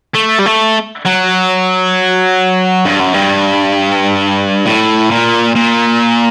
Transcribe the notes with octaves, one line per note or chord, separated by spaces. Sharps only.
A3
G3
A3
F#3
G2
F#2
G2
A2
A#2
A#2